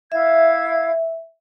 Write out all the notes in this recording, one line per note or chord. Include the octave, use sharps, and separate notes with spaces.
E4 E5 F5 G#6